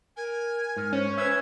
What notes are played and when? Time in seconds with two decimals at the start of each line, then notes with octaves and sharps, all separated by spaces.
0.16 A#4 G#5
0.77 G#2 F6
0.93 C#4 C5
1.18 B4 C5 E5 G#6